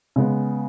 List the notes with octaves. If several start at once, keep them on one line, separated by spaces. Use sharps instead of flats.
C#3 G#3 B3